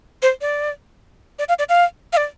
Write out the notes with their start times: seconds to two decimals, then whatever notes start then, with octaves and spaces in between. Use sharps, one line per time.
0.22 C5
0.41 D5
1.39 D5
1.49 F5
1.59 D5
1.69 F5
2.13 F5
2.17 D5